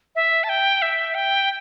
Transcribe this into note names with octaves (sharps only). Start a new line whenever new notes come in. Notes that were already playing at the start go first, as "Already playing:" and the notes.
E5
A5
G5
E5
G5